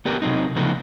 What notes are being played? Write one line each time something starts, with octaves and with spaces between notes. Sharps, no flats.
B3 D4 G4 A#4 B4
C3 F#3 C4 D#4
C#3 F3 A3 B3 D#4 B4